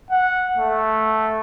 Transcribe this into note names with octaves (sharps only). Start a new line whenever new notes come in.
F#5
A3